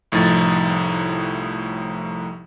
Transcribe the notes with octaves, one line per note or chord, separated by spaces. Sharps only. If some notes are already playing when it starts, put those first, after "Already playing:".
C2 A2 F3 D#4 A6